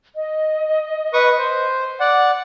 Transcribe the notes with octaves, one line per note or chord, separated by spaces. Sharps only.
D#5
B4 C#6 D#6
C5
D5 F#5